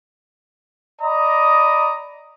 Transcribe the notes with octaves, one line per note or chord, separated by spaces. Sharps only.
D5 D#5 A#5 B5 D#6